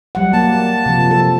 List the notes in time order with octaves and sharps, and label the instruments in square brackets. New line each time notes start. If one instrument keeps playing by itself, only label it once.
[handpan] F#3 G3 F#5
[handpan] A#3 [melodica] A5
[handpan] C3 F3
A4